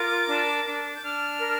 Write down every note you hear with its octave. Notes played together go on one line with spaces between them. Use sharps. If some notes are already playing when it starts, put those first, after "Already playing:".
Already playing: F4 A#4 D6
D4
D4
G6
D4 F6
A#4